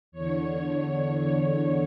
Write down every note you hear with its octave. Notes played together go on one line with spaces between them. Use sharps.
E2 D3 C#5
C#5
C#5
C#5